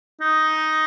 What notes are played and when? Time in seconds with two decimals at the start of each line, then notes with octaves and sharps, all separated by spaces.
0.21 D#4